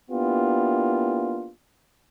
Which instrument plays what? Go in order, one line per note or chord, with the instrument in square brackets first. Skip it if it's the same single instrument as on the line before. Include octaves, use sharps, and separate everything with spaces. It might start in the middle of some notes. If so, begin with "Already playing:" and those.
[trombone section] A#3 B3 D4 E4 F4 G4